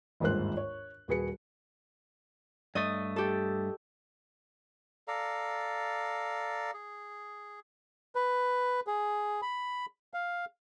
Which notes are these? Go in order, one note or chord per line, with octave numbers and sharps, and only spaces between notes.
G1 D#2 G#2 F4 C5 F#6
C#5
D#1 F#4 G#4 B4 C#7
G2 A3 D#5 C#6
G4 A4
A4 D5 F5 A#5
G#4
B4
G#4
B5
F5